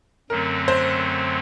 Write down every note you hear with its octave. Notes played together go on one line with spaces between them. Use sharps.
F#2 D3 F#3 A3 C4 A#4
C5